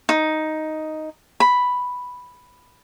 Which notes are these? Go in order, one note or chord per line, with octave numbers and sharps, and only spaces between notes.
D#4
B5